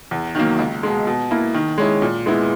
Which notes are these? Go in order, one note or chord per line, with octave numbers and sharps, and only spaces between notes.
E2
D#3 F#3 A#3
C#2
B2 G#3
B2
A#3 E4
D#3
G#3 C#4 E4
A#2
G#3 B3 E4